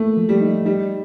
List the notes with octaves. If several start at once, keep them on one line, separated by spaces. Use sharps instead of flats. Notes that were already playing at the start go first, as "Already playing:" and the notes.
Already playing: A3 A#3
F3
G3
D#4
G3 D#4